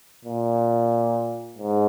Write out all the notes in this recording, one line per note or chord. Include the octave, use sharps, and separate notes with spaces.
A#2
G#2